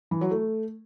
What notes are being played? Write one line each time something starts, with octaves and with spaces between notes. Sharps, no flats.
E3
F#3
A3